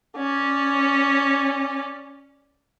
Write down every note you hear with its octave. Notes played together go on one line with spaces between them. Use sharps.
C#4 D5